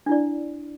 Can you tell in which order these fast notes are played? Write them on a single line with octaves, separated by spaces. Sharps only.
D4 E4 D5